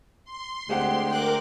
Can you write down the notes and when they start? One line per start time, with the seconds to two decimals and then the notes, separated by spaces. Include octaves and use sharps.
0.24 C6
0.69 D2 G#3 C4 G4 F#5
1.08 A#4 G5 D6 F#6